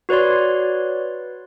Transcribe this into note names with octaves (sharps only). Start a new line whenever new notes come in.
F#4 B4 C#5 D5 C6